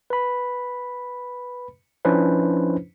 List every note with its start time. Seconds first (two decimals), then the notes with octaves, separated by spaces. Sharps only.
0.10 B4 B5
2.05 F3 C#4 D4 E4 B4 C5